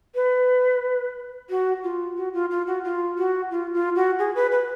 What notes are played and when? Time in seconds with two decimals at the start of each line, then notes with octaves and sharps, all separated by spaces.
0.15 B4
1.50 F#4
1.83 F4
2.17 F#4
2.34 F4
2.51 F4
2.67 F#4
2.84 F4
3.18 F#4
3.51 F4
3.73 F4
3.95 F#4
4.19 G#4
4.35 B4
4.52 B4